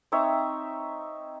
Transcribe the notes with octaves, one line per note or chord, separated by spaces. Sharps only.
C4 D#4 C#5 E5